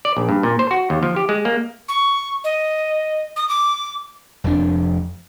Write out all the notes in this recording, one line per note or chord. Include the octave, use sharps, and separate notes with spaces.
D5
A#1
G2
A#2
C5
F#4
D#2
F3
G4
G#3
A#3
C#6
D#5
D#6
D6
F1 F2 F3 D4